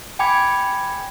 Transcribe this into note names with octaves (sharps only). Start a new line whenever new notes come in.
G5 G#5 B5 D6 G#6 C#7